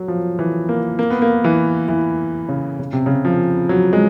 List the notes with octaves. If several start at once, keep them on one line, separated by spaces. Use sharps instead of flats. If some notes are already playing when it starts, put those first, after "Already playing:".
Already playing: F#3
F3
E3
A#3
A#3
B3
A#3
E3
E3
C#3
C#3
C3
C#3
F3
F#3
G#3